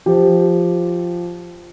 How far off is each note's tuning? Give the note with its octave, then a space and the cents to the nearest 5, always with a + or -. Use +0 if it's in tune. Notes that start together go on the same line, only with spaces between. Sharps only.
F3 +0 G4 +0